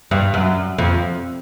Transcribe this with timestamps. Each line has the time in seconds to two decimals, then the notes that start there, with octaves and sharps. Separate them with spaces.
0.11 G2
0.34 F#2
0.78 F2